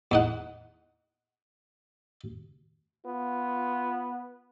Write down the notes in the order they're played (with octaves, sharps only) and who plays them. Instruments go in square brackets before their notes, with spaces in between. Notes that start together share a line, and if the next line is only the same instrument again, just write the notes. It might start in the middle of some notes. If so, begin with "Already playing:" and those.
[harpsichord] E2 D#4 F#5
[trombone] B3 [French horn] F4